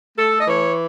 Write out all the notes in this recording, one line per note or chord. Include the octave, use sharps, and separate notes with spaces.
A3 A4
D#5
E3 C#5